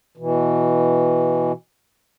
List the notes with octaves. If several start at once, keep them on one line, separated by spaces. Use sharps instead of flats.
B2 E3